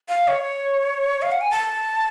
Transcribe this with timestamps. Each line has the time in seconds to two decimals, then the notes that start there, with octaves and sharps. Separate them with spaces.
0.09 F5
0.28 C#5
1.22 F5
1.32 F#5
1.41 G#5
1.51 A5